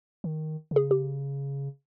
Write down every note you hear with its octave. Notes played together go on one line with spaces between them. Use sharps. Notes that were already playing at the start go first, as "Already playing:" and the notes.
D#3
C#3
G#4
G4